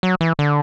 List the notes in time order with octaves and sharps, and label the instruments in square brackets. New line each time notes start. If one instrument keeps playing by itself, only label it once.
[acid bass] F#3
E3
D3